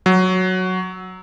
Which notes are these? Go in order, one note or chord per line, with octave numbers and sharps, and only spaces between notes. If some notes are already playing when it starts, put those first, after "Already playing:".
F#3